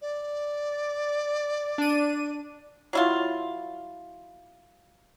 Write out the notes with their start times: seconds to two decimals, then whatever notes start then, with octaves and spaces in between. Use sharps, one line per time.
0.02 D5
1.78 D4 D#7
2.93 F#3 E4 F4